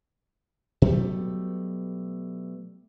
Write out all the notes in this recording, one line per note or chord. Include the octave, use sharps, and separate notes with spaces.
B2 F#3 G3 A3